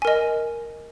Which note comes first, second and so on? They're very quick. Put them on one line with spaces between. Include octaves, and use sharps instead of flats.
G#5 A#4 D#5